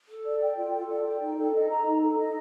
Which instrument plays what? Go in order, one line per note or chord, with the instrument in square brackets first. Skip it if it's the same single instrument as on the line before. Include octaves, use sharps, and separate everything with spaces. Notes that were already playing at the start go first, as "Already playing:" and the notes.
[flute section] A4
D5
G5
F4
A4
D5
G5
D#4
A4
D#5
A#5
D#4
A4
D#5